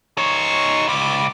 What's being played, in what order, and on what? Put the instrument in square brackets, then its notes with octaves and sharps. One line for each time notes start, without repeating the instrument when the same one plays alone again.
[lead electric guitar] D#4 C#5 [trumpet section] G#5 C6 C#6
[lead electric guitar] C#2 [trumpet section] D5 B5 D6